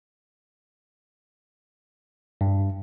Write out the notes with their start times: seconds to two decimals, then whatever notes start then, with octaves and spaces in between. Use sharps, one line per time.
2.41 G2